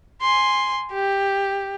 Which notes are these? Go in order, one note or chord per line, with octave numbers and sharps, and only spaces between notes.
G#5 C6
G4